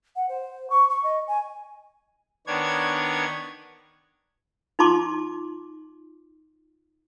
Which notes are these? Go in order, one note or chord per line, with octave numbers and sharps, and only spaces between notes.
F#5
C5
C#6
C#6
D#5
G#5
D#3 B3 D4 C#5 G#6
D#4 F4 A5 C6 D6